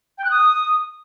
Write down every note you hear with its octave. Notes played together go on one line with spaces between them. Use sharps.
G5
F#6
D#6